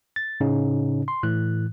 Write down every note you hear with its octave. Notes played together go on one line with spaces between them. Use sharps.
A6
A2 C#3 C#4 D#4
C6
A2 E3 F#6